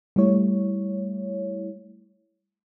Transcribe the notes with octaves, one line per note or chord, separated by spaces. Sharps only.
G3 A3 E4 C#5